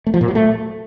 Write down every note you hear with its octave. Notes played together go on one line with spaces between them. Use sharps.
A3
F3
A#2
F#3
A3